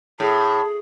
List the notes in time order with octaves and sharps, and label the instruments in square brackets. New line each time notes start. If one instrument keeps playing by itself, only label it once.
[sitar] A2 [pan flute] G#4 [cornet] A5